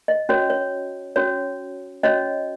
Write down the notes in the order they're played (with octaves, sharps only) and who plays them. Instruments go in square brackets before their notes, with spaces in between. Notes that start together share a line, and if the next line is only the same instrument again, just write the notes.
[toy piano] D#5
C#4 F#4 C#5
C#5
C#4 F#4 C#5
C#4 F#4 C#5 D#5